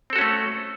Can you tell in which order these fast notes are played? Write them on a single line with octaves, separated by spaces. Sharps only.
C4 A4 F#4 C#4 A3